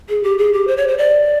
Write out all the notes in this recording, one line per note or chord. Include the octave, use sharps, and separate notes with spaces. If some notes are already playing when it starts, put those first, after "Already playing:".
G#4
G4
G#4
G4
C5
C#5
C5
D5